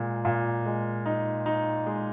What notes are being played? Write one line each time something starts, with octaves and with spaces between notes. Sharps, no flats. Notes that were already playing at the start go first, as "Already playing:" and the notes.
Already playing: A#2 G#3
A#2
G#3
D#4
D#4
G#3